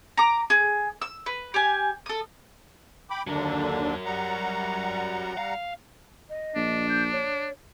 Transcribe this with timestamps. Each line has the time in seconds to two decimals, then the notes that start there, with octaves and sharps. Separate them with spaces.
0.17 A#5 D6
0.50 G#4
1.02 E6
1.26 B4
1.54 G4 G#5
2.06 A4 D#6
3.10 G5 B5 D6
3.27 D#2 D3 F#3 D4 A#4
4.05 G3 F#5 A#5
5.37 F5
6.30 D#5
6.55 A#1 D4
6.89 G6
7.13 C#5